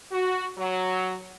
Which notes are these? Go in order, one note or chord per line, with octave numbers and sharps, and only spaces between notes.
F#4
F#3